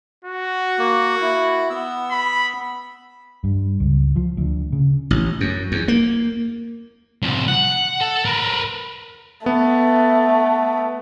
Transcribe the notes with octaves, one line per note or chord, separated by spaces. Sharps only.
F#4
A#3
E4
B3 E6
B5
G2
C#2
F3
D2
C#3
A1
F#2
E2
A#3
C2 F3
F#5
A4
A#4 B4
A3 B3